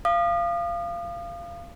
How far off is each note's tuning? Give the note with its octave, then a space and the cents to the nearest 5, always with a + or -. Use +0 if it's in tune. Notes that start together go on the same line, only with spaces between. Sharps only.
F5 -20 D#6 -40